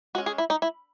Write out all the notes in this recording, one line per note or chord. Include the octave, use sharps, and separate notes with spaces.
G#3 C#4 F#4
G#4
E4
D#4
E4